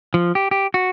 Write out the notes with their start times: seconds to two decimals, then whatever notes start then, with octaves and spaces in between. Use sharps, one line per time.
0.14 F3
0.35 G4
0.51 G4
0.74 F#4